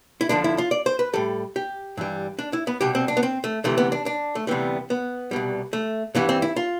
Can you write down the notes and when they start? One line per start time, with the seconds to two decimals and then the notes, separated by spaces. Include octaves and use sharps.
0.21 E4
0.29 F2 D3 F3 D4
0.44 E4
0.58 F4
0.71 D5
0.86 C5
0.99 B4
1.13 A2 G3 A4
1.56 G4
1.97 G2 E3 G3
2.39 D4
2.53 E4
2.67 B3
2.81 C2 B2 G3 G4
2.95 C4
3.08 D4
3.17 B3
3.23 C4
3.44 A3
3.64 D2 C3 E3 A3
3.78 B3
3.92 D4
4.06 D4
4.35 A3
4.47 D2 C3 E3 G3 B3
4.90 B3
5.31 C2 B2 G3
5.73 A3
6.15 G2 E3 G3 B3
6.29 C4
6.42 E4
6.56 F4